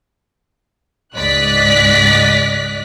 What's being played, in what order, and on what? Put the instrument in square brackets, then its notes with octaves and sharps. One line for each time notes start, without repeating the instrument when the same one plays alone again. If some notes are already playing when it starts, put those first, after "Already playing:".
[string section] C#2 G#2 D5 D#5 F#6 B6